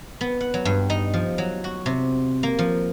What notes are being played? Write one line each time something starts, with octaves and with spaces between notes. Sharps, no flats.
B3
F#5
F#3
G2
D#4
F3
F#3
F#4
C3
A#3
F3